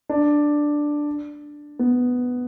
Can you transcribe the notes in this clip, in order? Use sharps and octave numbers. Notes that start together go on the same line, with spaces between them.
D4
B3